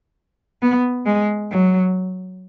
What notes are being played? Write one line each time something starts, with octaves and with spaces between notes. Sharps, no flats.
B3
G#3
F#3